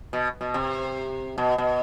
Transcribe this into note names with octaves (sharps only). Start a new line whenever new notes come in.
B2
B2
C3
B2
B2